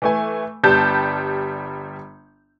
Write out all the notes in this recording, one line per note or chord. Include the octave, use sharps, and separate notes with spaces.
E3 A3 G#5
G1 G3 A5 G6